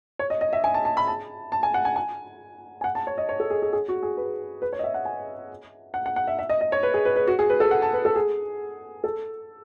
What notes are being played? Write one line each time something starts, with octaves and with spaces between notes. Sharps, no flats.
C#5
D#5
D#5
E5
G#5
A5
A5
B5
A5
A5
G#5
F#5
G#5
G#5
G#5
F#5
A5
C#5
D#5
C#5
A4
G#4
G#4
G#4
F#4
G#4
B4
B4
C#5
D#5
E5
F#5
G#5
F#5
F#5
F#5
E5
E5
D#5
D#5
C#5
B4
G#4
B4
B4
F#4
G#4
B4
A4
F#5
A5
B4
A4
G#4
A4